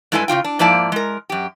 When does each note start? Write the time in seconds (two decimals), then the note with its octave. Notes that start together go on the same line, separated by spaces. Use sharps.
0.12 G2 G#3 E4 A4 B4 G#5
0.28 C#3 E3 F4 G5
0.44 D4
0.59 G#2 F3 A#3 E4 D5 A5
0.92 G#3 A#4
1.30 F#2 G4